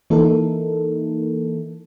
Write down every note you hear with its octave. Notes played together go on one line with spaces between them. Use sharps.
E3 A#3 D#4 E4 A4 A#4